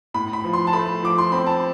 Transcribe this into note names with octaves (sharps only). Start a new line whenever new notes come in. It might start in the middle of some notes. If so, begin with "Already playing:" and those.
A2 B5
B5
F3
C6
A5
A3 B5
F3 D6
C6
C4 B5
A5